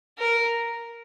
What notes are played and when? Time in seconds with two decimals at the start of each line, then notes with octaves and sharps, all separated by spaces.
0.18 A#4